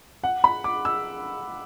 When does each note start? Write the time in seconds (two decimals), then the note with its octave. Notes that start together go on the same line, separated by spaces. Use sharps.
0.24 F#5
0.44 B5
0.64 D6
0.85 E6